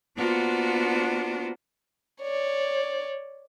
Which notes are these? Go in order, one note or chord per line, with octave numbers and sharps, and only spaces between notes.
A#3 B3 D4 F4 F#4 C5
C#5 D5